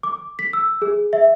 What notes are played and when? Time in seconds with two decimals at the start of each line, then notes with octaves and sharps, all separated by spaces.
0.03 D6
0.39 B6
0.53 E6
0.82 G#4
1.13 E5